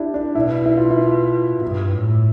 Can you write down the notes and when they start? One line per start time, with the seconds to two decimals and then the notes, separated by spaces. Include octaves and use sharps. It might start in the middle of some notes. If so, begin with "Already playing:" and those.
Already playing: D4 E4 G4
0.14 D4
0.35 B2 E4
0.66 E4
0.78 F4
0.91 E4
0.99 F4
1.62 G2 E4
1.94 A2